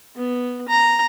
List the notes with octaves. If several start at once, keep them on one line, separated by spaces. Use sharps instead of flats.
B3
A#5